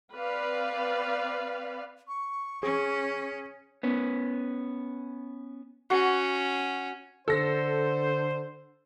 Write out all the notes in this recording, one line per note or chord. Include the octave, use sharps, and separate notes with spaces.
C4 B4 D5 F5
C#6
C#4 G#4
B3 C#4
C#4 F#4
D3 A4 C5 A#6